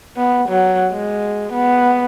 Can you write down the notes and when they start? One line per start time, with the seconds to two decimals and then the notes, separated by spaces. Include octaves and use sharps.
0.17 B3
0.49 F#3
0.92 G#3
1.53 B3